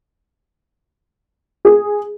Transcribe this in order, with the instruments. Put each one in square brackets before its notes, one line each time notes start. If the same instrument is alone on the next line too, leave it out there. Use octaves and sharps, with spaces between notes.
[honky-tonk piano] G#4